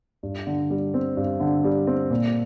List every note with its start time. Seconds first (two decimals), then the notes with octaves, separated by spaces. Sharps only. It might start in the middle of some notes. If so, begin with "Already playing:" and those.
0.23 G2
0.47 D3
0.70 G3
0.94 C4
1.17 G2
1.40 D3
1.64 G3
1.87 C4
2.10 A#2